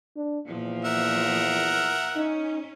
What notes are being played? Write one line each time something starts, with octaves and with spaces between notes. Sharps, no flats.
D4
E2 A#2 F3
A#4 E5 F#5
C#4 D#4